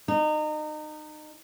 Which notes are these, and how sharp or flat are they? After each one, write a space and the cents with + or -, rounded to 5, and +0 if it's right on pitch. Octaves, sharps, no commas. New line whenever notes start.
D#4 -30